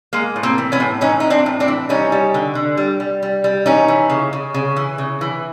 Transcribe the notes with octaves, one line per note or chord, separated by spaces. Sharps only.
G#3 A#3
A2
A#3 C4
E3
B3 C#4
A2
E3 C#4 D#4
E3 D#4
C4 D4
A2
C4 D4
E3
G3 C#4 D#4
G3
D3
D3
G3
G3
G3
G3
E3 C#4 D#4
E3
C#3
C#3
C#3
E3
C#3
E3